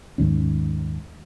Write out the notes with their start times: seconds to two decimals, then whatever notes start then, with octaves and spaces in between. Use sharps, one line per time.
0.18 D#2 G#2 D#3 C#4